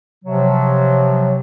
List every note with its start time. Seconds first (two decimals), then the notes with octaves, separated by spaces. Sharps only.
0.25 C3 F3 F#3